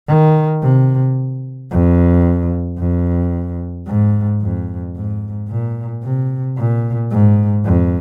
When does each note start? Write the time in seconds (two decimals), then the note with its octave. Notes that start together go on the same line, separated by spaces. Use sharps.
0.08 D#3
0.62 C3
1.71 F2
2.79 F2
3.87 G#2
4.41 F2
4.95 G#2
5.48 A#2
6.03 C3
6.57 A#2
7.11 G#2
7.65 F2